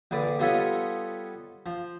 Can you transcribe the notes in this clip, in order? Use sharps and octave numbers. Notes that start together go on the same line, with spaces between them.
A#1 D3 B4 D5
G3 B3 F4 A4 C#5 D#5
F3